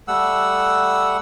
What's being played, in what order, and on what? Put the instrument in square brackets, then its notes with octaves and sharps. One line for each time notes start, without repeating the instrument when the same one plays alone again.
[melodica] G3 A3 F#5 E6